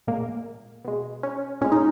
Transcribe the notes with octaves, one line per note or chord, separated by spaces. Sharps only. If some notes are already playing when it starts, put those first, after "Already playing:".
A#2 G#3 A#3
B2 G#3
C#4
A#2 G#3 C#4
D#4